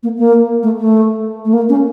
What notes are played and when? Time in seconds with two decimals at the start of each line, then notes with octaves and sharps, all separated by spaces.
0.03 A#3
0.18 A#3
0.63 A3
0.78 A3
1.45 A3
1.53 A#3
1.69 C#4